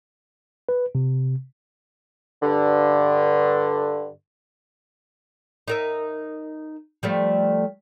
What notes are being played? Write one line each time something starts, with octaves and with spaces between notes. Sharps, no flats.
B4
C3
G2 D3
D#4 A#4 E5
F3 G3 A3